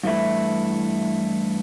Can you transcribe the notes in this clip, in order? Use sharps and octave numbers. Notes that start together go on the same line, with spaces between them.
G2 E3 A3 E4